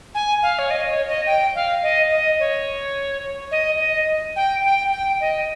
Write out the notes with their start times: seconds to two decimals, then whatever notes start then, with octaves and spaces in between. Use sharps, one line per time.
0.15 G#5
0.43 F5
0.59 C#5
0.70 D#5
0.89 C#5
1.08 D#5
1.27 G5
1.55 F5
1.83 D#5
2.11 D#5
2.40 C#5
3.51 D#5
3.80 D#5
4.36 G5
4.64 G5
4.92 G5
5.21 D#5